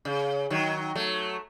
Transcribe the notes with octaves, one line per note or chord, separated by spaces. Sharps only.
C#3
D#3 F#3
F#3 A3